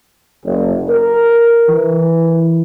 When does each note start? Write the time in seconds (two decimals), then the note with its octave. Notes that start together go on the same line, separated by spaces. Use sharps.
0.45 F#1
0.88 A#4
1.69 E3